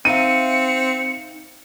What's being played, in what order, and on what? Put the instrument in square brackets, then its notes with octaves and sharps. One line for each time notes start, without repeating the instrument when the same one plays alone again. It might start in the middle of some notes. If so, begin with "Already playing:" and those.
[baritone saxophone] C4 [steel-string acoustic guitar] D#4 E5 F5 [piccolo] C#7 [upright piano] D#7